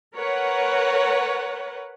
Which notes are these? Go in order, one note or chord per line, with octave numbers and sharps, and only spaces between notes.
A#4 B4 C#5 F#5